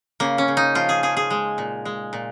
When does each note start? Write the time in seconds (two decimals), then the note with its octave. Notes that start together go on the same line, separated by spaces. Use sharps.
0.20 C#3 A#3
0.38 C#4
0.48 C#3
0.57 D#4
0.75 F3 F4
0.89 G#4
1.03 F3 G#4
1.17 G#4
1.31 G#3
1.58 A#2
1.85 G#3
2.13 A#2